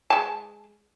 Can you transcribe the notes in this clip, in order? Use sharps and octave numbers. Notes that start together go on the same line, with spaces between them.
G#3 A5